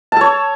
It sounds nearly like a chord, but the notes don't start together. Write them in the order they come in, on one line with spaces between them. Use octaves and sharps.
A5 A4 C#5